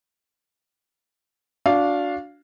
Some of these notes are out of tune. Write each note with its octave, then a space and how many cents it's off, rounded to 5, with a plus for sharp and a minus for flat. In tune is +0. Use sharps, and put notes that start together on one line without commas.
D4 -15 F#4 -25 F5 +0